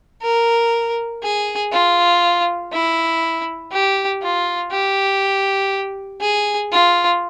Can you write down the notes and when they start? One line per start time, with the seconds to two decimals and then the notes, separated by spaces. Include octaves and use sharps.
0.22 A#4
1.23 G#4
1.72 F4
2.73 E4
3.72 G4
4.23 F4
4.72 G4
6.21 G#4
6.72 F4